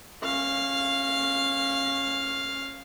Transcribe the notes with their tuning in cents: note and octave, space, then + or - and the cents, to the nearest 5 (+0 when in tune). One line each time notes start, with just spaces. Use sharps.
C#4 -25 F5 +0